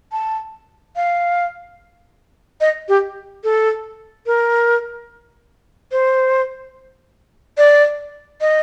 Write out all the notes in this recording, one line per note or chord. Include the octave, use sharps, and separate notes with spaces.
A5
F5
D#5
G4
A4
A#4
C5
D5
D#5